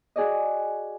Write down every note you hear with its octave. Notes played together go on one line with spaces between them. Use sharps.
F#4 G#4 D5 D#5